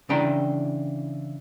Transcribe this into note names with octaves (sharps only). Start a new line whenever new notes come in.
C#3 E3 D4 G5 A#5